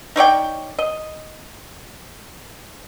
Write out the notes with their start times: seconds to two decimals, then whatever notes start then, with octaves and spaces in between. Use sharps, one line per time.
0.16 D#4 C#5 D5 G5
0.79 D#5